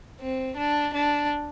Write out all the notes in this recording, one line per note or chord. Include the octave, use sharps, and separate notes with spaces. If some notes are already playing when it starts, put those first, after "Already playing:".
C4
D4
D4